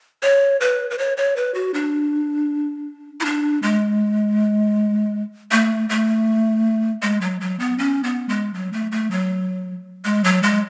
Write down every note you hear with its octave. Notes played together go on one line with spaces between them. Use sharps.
C#5
B4
B4
C#5
C#5
B4
F#4
D4
E4
D4
G#3
A3
A3
G#3
F#3
F#3
B3
C#4
B3
G#3
F#3
A3
A3
F#3
G#3
F#3
G#3